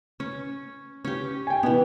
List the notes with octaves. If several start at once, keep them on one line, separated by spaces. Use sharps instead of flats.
C#4
C#4 G4
G5 G#5
B2 E3 B3